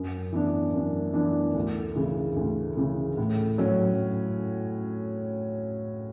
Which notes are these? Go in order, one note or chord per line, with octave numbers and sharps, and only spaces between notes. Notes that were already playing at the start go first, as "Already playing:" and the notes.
Already playing: F#2
E3 B3 D4
F#2
E3 B3 D4
D2
C#3 E3
D2
C#3 E3
A2
F#3 C#4